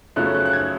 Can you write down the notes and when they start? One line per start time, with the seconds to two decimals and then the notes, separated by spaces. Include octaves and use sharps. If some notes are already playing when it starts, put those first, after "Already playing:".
0.16 F#2 C#3 F3 A3 C#4 F#6
0.35 F#6
0.45 F#6
0.53 G#6